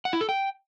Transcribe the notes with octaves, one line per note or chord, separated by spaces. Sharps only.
F#5
E4
A4
G5